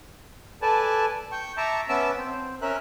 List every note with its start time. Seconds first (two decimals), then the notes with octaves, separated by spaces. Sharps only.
0.62 A4 B4 D5 G#5 A5
1.32 G5 C#6
1.57 E5 A5 A#5 C#6 D6
1.89 B3 C#4 E5 A5 D6 E6
2.18 C4
2.62 C#4 A#4 E5 F#6